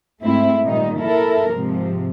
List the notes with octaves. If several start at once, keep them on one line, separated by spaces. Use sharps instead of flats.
G#2 A3 C4 E4
A#2 D#3 G3 D#4
E4 A4 A#4
G#2 C3 F3